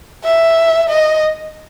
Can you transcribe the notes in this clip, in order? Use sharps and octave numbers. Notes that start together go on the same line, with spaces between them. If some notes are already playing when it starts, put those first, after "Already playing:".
E5
D#5